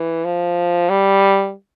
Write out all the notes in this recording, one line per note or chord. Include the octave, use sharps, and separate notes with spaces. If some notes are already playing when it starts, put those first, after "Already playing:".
Already playing: E3
F3
G3